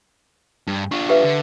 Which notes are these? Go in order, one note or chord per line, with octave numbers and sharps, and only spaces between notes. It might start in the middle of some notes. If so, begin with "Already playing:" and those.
G2
D4 F4 C#6
G4 B4 E5
D3